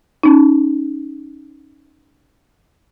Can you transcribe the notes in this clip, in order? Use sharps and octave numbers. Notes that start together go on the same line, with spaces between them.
C#4 D#4